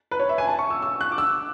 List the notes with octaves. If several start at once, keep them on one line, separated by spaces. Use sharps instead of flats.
B4
C#5
E5
G#5
A5
C#6
E6
E6
F#6
D6
E6